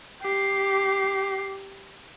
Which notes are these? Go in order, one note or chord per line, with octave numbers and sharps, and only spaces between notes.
G4 C7